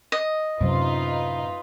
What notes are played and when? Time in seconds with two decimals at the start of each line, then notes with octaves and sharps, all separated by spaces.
0.12 D#5
0.61 F#2 A2 C3 C4 D#4 F4 B4